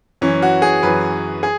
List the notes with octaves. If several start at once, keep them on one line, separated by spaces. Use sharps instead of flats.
F#2 E3 C#4
F#4
G#4
F#2 E3 B4
G#4